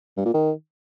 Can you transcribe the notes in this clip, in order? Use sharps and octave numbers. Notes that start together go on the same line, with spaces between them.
G2
A#2
D#3